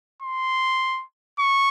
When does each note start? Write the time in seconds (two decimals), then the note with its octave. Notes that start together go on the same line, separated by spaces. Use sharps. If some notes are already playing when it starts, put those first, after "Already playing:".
0.22 C6
1.39 C#6